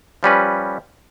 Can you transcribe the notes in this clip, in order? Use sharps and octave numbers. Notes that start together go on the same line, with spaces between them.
F3 G3 C#4 B4